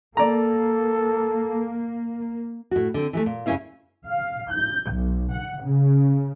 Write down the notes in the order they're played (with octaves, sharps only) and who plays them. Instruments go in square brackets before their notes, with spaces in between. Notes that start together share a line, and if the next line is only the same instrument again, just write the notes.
[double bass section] A#3 [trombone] A4 [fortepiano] D5 A#5
[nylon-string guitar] A2 F#4
D3 C4
E3 G#3 A3
A#2
G2 C#3 F#3 C#4 E4 F5
[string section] F5
G6
B1
F#5
C#3